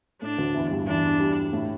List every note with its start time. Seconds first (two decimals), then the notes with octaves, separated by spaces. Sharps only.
0.22 A2 D4
0.38 D2 D3
0.54 E2 E3
0.71 G2 G3
0.87 E2 E3 D4
1.20 G2 G3
1.53 A2 A3